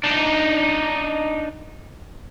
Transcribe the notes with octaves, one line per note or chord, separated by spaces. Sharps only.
D4 D#4